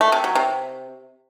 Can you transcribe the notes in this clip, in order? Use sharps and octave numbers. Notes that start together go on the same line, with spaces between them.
A3
C3
F#3
C3